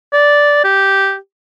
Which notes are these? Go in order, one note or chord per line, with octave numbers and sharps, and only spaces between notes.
D5
G4